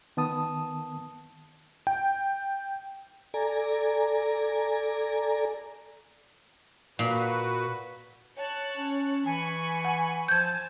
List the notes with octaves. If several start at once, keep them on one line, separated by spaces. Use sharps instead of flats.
D#3 B3 A5 D#6
G5
A4 D5 G#5 A#5
A#2 F#4 B4
C#5 A5 F#6
C#4
E3 G#5 B5 C#6
F#5
F3 G#5 A5 E6 G6 G#6